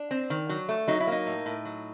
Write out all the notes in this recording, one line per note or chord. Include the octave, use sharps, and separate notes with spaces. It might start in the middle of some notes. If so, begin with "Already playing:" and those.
Already playing: D4
C4
D#3
F#3
A3
F#3 D#4
E4
A#3 D#4
A2
A2
F#3